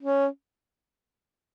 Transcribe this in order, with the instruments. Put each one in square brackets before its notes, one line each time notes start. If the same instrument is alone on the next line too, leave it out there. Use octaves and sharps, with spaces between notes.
[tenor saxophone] C#4